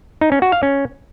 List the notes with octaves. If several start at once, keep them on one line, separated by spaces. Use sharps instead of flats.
D#4
C#4
F#4
F5
C#4